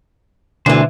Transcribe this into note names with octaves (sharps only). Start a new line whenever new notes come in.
D2 B2 D3 E3 D4 C5